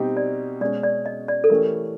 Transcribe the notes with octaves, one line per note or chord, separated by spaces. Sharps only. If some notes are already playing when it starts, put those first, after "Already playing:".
Already playing: B2 G3 C4 D#4 G4
D5
B2 G#3 C#4 D5
D5
D#5
D5
A4
E3 A3 C#4 E4 G4 A#4